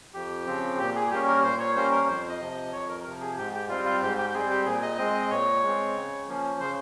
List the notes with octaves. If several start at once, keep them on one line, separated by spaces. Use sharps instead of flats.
F2 G4
C#3 F3 C4
A#2 G4
G#4
G3 A#3 C#4 G4
A#4
A#2 C5
C#5
G3 A#3 C#4 C5
A#4
F2 C5
D#5
C3 F3
D#5
F2 C#5
A#4
C3 F3 A#4
G#4
G#2 G4
G4
G3 C4 F4
F4
G#2 G4
G4
G4
G3 C4 G#4
G4
A#2 G#4
D#5
G#3 C4 D#5
D#5
A#2 C#5
G#3 C4
C#3
F3 A#3 C#4
C#3 C5